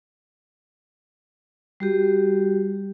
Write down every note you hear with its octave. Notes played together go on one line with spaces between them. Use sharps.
G3 F#4 G4